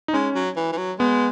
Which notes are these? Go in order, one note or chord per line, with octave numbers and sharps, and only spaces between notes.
D#4
G#3 C#4
F#3
E3
E3
F#3
G#3 B3